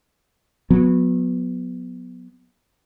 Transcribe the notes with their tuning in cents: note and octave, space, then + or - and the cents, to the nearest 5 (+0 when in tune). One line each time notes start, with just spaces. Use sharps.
F#3 -30 B3 +0